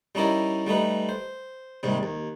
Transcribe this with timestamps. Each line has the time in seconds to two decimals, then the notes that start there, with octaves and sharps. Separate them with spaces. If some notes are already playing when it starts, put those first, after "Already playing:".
0.15 G3 C#4 D#4 E4 A#4 D5
0.67 G3 A3 D#4 B4
1.09 C5
1.83 D#2 G#2 C3 G3
2.03 D#2